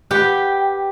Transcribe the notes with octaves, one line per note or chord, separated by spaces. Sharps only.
G4 B4 F#5 G5